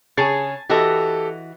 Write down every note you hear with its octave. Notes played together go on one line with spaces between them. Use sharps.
C#3 G#4 C#5 G#5 A5 A6
E3 F#4 G4 A4 D#5